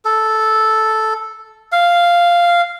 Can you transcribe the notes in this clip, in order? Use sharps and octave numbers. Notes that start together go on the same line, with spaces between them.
A4
F5